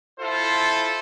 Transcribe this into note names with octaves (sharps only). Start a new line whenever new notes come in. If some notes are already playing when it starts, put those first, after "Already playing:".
E4 F4 A4 C5